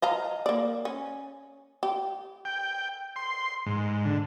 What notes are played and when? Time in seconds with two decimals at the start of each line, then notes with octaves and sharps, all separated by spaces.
0.02 D#5 F5 A#5
0.46 A#3 D5
0.85 C#4
1.83 G4
2.45 G5
3.16 C6
3.66 G#2
4.05 D3